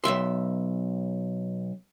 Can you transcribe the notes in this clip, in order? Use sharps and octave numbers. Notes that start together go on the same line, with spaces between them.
B1 C#3 E5 C6